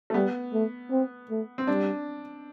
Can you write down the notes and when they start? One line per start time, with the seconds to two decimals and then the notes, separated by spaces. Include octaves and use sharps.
0.10 A3
0.14 G3 B3
0.53 A3
0.91 C4
1.30 A3
1.58 C4
1.67 G3 D4